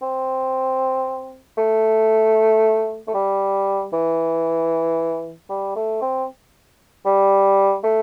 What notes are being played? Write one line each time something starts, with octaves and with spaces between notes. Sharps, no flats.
C4
A3
A3
G3
E3
G3
A3
C4
G3
A3